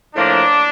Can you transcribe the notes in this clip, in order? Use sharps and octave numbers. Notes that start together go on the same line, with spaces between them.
A2 F3 A#3 D4